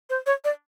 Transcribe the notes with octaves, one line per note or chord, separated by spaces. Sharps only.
C5
C#5
D5